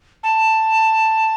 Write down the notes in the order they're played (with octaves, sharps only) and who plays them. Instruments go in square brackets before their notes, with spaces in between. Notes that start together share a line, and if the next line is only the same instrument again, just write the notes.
[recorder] A5